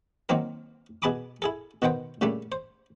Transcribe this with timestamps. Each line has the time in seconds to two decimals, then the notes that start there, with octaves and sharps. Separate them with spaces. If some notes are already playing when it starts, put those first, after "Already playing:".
0.29 D#3 F#3 A#3 C4 A#4
1.02 B2 G#4 A5 B5 D6 D#6
1.42 E4 G#4 A4
1.82 B2 D#3 B3 C5 G5
2.21 A#2 C#3 G3 A3 D4
2.52 C5